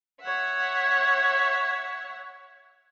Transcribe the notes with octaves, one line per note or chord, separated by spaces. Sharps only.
C#5 E5 F#5